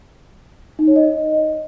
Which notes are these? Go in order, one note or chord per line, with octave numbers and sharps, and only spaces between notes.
D#4
C#5
D#5